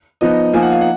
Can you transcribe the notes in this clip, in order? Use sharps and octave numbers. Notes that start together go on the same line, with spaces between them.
F3 B3 D#4 D#5
F3 A#3 D#4 G#5
F#5
F5
F#5